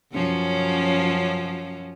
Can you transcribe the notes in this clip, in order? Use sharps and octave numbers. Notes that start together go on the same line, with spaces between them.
F#2 F3 C#4